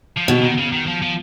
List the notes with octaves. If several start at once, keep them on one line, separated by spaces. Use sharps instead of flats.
F3
B2 D#3
D#3
C#3
D#3
F3
F3